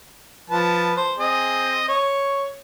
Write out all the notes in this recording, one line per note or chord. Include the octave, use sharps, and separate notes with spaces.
F3 B4 A5
C5
C4 G#4 D#5
C#5